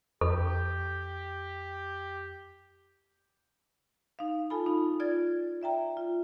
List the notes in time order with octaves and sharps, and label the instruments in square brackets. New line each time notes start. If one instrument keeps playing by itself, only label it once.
[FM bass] F2 [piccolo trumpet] G4 [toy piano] A4
[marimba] D#4 F5
F4 A4 G#5 A5 B5
D#4
F4 D5 G#6 A6
D5 E5 G5 A#5
F4